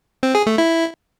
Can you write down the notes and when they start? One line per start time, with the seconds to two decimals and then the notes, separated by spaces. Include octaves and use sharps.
0.23 C4
0.35 G#4
0.46 A3
0.58 E4